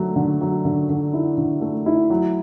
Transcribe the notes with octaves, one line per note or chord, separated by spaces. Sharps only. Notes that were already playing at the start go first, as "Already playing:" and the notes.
Already playing: D3 F#3 A3
D3
F#3
D3
D3
E4
D3
A3
E4
F#3